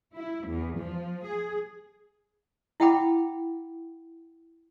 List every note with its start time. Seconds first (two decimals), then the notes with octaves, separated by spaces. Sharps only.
0.15 E4
0.47 E2
0.79 F3
1.27 G#4
2.80 E4 E5 F#5 G5 B5 D6